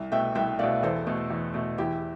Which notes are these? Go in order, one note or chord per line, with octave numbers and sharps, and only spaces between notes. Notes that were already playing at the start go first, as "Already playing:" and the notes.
Already playing: C2
B2 A3 E5 G5
C2 E5 G5
B2 A3 D5 F5
E2 A4 C5
B2 A3
E2
B2 A3
E2 E4 G4